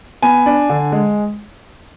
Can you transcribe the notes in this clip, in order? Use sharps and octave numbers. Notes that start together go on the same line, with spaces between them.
B3 G#5
D4
D3
G#3